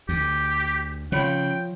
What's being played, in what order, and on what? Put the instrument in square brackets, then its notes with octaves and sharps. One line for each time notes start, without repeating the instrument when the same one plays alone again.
[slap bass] D2 [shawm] G4
[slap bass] C#3 [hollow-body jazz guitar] F3 C#5 B5 [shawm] G5